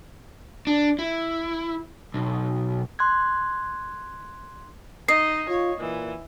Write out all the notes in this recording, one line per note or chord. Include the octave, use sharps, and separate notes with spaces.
D4
E4
B1
C6 F#6 G#6
D#4 D#5 C7
F4 C#5
A#2 E3